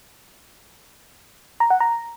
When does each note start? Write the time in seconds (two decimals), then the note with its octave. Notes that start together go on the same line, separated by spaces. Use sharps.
1.60 A#5
1.70 F#5
1.80 A#5